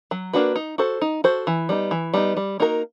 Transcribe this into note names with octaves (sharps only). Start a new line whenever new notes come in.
F#3
A#3 D4 F#4 B4
D#4
F#4 A4 C5
D#4
F#4 A4 C5
E3
G3 B3 D#4
E3
G3 B3 D#4
G3
A#3 D#4 F#4 A#4